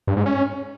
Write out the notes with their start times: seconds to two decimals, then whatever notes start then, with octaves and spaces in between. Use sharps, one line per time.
0.07 G2
0.17 G#2
0.26 C#4